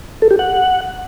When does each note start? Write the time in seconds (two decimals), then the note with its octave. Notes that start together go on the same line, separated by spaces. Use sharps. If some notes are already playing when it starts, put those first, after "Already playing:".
0.22 A4
0.31 G4
0.39 F#5